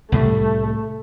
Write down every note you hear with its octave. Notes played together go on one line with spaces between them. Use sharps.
C2 A2 G3 A3